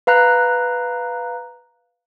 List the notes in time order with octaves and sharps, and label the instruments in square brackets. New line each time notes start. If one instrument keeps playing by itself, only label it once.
[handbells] B4 F5 A#5 F#6